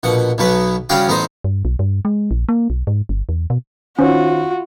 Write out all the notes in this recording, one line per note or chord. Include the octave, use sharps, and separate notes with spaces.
A#1 B2 F#5
B1 B2 F#3 B3 B4
C#3 G3 C#4 F#4 F5 G5
A1 B3 D#4 C5 D#5
G2
B1
G2
G#3
A#1
A#3
B1
G#2
G1
E2
B2
D#3 C#4 F4 F#4 C5 C#5